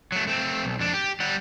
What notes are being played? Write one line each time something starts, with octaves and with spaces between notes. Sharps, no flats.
F#3 A3
A3 C4
B1
F2 D4
G4
G3 F#5